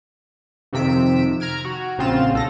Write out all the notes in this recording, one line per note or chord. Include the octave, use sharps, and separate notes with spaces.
F2 C3 D#3 E6 B6 D7
A#5 F6 G#6 D7
F#4
A#1 C#3 C4 F4 E7
B1 A4 A#6